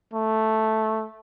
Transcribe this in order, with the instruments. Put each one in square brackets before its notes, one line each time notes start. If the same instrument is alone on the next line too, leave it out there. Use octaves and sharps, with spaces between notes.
[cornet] A3